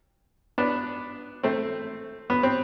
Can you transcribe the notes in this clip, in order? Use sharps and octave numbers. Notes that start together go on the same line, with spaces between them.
B3 D4
A3 C4
B3
C4